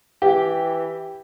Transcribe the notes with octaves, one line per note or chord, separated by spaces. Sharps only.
E3 G4